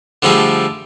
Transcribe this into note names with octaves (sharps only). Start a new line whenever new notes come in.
D3 F3 G3 A3 G#4